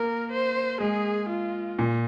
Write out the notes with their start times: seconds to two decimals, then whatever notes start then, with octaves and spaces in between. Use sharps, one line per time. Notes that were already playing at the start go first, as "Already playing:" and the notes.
Already playing: A#3 A#4
0.31 C5
0.80 G#3 G#4
1.29 F4
1.79 A#2